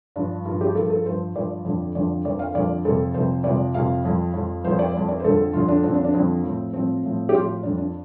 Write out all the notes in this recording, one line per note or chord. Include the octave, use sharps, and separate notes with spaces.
G2 F3 D4
G2 F3 F4
G4
G2 F3 A4
A4
G2 F3 C5
G2 F3 D5
F2 D3 F3
F2 D3 F3 D5
F2 D3 F3 D5
F5
F2 D3 F3 D5
F2 C3 F3 A4
F2 C3 F3 C5
F2 C3 F3 D5
F2 C3 F3 F5
F2 F3
F2 F3
F2 F3 C5
D5
F2 F3
D5
C5
F2 D3 F3 A4
F2 D3 F3 F4
D4
F2 D3 F3 C4
D4
D4
F2 D3 F3 C4
A2 F3
A2 F3 C4
A2 F3
G4
A2 F3 F4
F2 F3 D4
D4